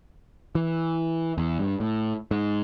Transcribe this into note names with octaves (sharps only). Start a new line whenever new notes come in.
E3
E2
G2
A2
G#2